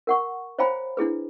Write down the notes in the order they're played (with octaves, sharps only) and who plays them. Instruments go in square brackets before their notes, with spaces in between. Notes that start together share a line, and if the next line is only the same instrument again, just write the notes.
[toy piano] A#4 F#5 C#6
C5 C#5 F5 G5 A#5 B5
D4 E4 G#4 B4